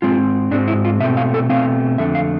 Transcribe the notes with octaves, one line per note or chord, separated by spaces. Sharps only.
G#2 G#3 C4 F4
G#2 G#3 C4 D4
E4
F4
B2 A3 C4 E5
F5
A4
B2 A3 C4 F5
F2 D3 A3 E5
F5